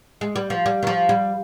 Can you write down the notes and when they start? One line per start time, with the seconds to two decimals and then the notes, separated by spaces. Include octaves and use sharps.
0.21 G#3
0.36 G3
0.50 F3
0.66 G3
0.83 D#3
0.87 F3
1.09 G3